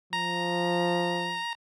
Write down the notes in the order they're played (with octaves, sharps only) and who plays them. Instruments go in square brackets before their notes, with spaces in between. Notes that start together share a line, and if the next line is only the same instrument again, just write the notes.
[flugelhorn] F3 [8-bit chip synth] A#5